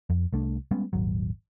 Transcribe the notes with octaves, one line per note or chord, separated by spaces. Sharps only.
F2
C2 A3 D4
G3 G#3 B3 C#4
D#1 G#1 F#3